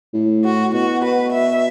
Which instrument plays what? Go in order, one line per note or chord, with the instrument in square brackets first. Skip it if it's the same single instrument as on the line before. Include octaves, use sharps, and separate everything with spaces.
[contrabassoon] A2
[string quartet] F#4
[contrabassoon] B2 [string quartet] F#4
[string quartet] B4
E5